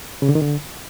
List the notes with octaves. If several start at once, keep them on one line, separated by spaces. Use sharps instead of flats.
C#3
D3
D#3
D3